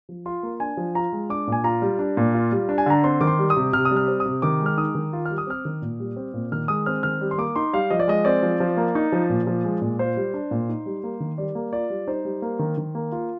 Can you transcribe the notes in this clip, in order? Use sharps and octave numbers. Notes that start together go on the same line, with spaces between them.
F3
F4 C6
A#3
D4 G#5
F3
F4 A#5
G#3
D4 D6
A#2 G#5
F4 A#5
G3
D4
A#2
F4
G3
D4
G#5
D3 A#5
C4 C6
D#3 D6
C6
G3
D#6
C3
C3 F6
D#6
G3
F6
C4
D#6
C3
D#3 D6
G#3
F6
D#4 D#6
D#3
F4
G3 F6
D#6
C4 F6
D#3
A#2
G3
C4
A#2
D#3 F6
G#3 D#6
C4 F6
D#3 F6
G3
C6
A#3 D6
D#4 C6
G3 F5
F3 D#5
D5
G#3 D#5
C4 D5
F3
F3
A#3
D#4
F3
A#2
F3
G#3
A#2
F4 C5
G3
D4
A#2
D#4
G3
A#3
D#3
G3 D5
A#3
F4 D5
G3
D#4 C5
G3
A#3
D#3
D#3
A#3
F4